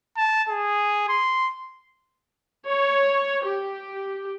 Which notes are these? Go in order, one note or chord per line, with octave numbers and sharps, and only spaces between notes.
A5
G#4
C6
C#5
G4